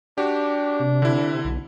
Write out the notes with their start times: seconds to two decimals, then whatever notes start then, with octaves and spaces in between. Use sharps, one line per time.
0.18 D4 F#4 G4
0.80 C3
1.02 D3 E4
1.45 B1